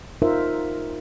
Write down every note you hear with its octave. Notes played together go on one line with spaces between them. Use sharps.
D#4 F4 A#4 C5 E5